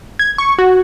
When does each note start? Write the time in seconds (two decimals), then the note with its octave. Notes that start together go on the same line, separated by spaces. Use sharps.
0.19 G#6
0.38 C#6
0.59 F#4